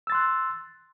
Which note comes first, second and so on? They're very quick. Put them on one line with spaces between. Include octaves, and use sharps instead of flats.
E6 A6 C6 F#6